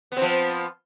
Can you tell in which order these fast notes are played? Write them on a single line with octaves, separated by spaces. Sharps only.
B3 C4 F3